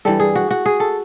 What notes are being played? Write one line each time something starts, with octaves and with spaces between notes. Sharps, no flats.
G2 E3 G3 A4
G#4
F#4
F#4
G#4
A4